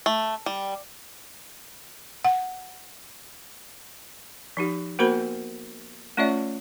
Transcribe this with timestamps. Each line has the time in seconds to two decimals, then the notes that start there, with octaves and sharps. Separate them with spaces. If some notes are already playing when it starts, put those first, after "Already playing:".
0.06 A3
0.46 G3
2.25 F#5
4.57 F3 D#4 G4
4.99 A#3 B3 F#4 A#4 C5 B5
6.17 A3 C#4 F4 C#5 D5 E5